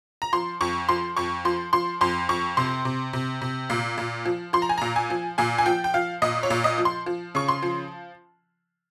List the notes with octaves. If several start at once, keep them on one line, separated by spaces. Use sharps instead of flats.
A#5
F3 C6
F2 C#6
F3 C6
F2 C#6
F3 C6
F3 C6
F2 C6
F2 C#6
C3 C6
C3
C3
C3
A#2
A#2
F3
F3 C6
A#5
G#5
A#2 A#5
G#5
F3
A#2 G#5
G#5
F3 G5
G5
F3 F5
A#2 D#5
C#5
A#2
D#5
F3
C6
F3
C#3 C#6
C6
F3